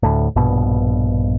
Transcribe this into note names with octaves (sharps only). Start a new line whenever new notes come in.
D2 A2
A#1 G2 B2